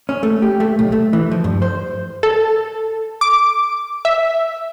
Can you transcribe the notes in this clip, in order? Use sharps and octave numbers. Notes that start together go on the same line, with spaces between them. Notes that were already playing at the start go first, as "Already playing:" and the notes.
C#4
A3
G4
A3
B1
A3
E3
F3
G2
C5
A4
D6
E5